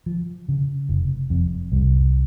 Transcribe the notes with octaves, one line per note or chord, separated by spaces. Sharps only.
F3
C#3
F1
F2
C2